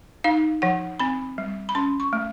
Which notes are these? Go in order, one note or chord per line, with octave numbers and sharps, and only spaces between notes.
D#4 F5
F3 F#5
C4 B5
G3
B5
C#4 C6
C#6
A3